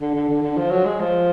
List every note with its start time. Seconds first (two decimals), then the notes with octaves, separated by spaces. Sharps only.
0.01 D3
0.14 D3
0.29 D3
0.42 D3
0.57 F3
0.70 F#3
0.85 G#3
1.00 F3